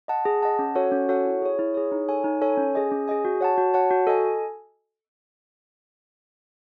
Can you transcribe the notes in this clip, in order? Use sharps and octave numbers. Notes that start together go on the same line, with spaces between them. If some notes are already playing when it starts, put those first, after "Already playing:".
D#5 F#5 A5
G#4
D#5 F#5 A5
C#4
F#4 A4 C#5 F#5
C#4
F#4 A4 C#5 F#5
E4
G#4 C#5
E4
G#4 C#5
D#4
A4 C#5 G#5
D#4
A4 C#5 G#5
C#4
G#4 D#5 G#5
C#4
G#4 D#5 G#5
F#4
C#5 F#5 A5
F#4
C#5 F#5 A5
F#4
A4 D#5 G#5